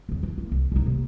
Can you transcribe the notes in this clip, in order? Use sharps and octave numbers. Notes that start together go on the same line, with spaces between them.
E2 C#3
E3
A#3
C2
C2 D#4
C3 A#3